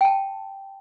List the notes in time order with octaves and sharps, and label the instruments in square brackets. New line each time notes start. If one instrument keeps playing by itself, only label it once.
[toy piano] G5 A5